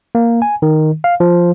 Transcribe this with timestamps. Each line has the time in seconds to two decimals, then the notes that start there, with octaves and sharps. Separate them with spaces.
0.15 A#3
0.42 G#5
0.62 D#3
1.04 F5
1.20 F3